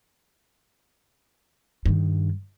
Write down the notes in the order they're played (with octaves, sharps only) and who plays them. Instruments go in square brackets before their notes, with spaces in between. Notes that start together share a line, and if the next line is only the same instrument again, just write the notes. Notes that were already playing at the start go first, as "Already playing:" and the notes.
[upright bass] G2 D#3